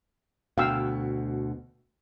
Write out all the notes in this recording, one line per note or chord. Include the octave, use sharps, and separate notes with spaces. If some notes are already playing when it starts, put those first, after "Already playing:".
D2 B2 F5 G5 E6